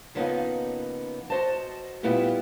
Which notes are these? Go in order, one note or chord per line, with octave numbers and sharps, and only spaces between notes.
C#3 F3 A#3 B3 C#4 D#4
F#4 C5 D#5 A5
A#2 G3 B3 E4 F4 G4